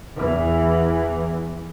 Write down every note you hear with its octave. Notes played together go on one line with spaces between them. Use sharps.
E2 E3